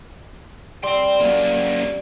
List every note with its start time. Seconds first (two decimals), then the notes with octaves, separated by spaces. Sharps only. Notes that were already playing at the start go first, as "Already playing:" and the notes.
0.83 G3 G5 C6
1.20 F#2 A#3